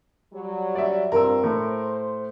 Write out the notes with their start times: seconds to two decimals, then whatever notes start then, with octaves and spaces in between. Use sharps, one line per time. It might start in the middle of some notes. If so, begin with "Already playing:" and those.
0.33 F#3 G3
0.75 D5 E5
1.12 G2 C4 F4 A#4 E6
1.44 A2 C5